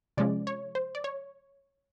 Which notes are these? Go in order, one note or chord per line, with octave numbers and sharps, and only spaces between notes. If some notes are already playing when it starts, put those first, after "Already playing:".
C3 F3 G#3 C#4 D5
C#5
C5
D5
C#5